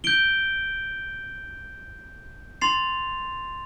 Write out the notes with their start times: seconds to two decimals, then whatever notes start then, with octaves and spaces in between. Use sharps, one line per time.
0.04 G6 D7 G7
2.61 C6 A6 C7 F7